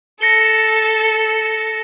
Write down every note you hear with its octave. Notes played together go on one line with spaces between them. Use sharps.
A4 A#6 C#7 G7